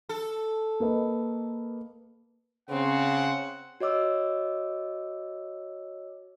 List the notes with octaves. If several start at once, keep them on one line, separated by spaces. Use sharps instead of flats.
A4
A#3 B4 D#5
C#3 C4 F#5
F#4 C#5 D#5 D6 E6